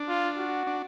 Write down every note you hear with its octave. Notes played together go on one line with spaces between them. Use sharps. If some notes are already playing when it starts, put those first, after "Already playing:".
Already playing: D4
F4
F#4
D4